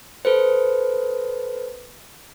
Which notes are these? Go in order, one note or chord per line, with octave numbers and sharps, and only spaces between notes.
A4 B4 C5